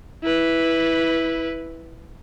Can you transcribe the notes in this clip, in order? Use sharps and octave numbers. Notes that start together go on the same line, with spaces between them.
E4 B4